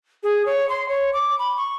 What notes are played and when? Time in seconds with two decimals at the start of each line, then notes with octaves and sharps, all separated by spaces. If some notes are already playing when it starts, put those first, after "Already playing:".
0.23 G#4
0.46 C#5
0.69 C6
0.89 C#5
1.13 D6
1.39 B5
1.57 C#6